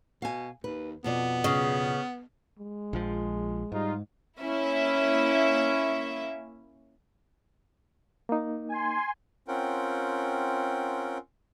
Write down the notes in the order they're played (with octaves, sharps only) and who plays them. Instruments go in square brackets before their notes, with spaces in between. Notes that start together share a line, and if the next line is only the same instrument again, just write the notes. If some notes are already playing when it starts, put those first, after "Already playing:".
[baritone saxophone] B2 [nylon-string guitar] F5 G#5
[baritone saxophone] D#2 [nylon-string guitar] B4
[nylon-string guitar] F2 B2 D5 [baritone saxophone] B3
[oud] C#3
[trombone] G#3
[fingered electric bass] A#1 F3
[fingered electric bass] G#2 [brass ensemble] G3 D#4 F4
[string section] A#3 C#4 E4 E5
[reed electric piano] A#3 D#4
[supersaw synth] G#5 C6
[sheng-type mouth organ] C4 C#4 F4 A#4 F#5 G5